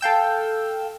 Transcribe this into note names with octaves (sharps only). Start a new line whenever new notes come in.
A4 F5 G5 E6